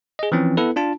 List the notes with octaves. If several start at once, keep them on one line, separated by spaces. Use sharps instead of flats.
G#4 D#5
E3 F3 C4 C#4
B3 E4 A4 B4
D4 F4 A5